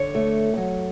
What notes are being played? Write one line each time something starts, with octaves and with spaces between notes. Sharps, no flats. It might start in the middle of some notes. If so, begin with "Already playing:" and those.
Already playing: D3 C#5
A3
F#3